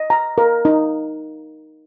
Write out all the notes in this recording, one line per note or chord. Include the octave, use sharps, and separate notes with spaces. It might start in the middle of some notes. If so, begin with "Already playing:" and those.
Already playing: D#5
A#5
A#4
D#4